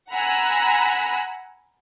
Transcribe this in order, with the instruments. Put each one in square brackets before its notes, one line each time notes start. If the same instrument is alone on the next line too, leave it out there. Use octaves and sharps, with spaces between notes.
[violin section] F#5 G#5 A#5 B5 E6 F#6